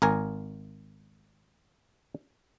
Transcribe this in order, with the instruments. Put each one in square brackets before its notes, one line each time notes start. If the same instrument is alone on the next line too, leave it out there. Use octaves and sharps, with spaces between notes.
[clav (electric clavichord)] G#1 A#4 G#5